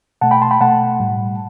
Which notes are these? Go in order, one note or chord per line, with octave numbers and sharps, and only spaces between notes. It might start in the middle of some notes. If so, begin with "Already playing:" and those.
B2 A3 F#5 A5
G5 B5
A5 C6
G5 B5
B2 A3 F#5 A5
A2 G3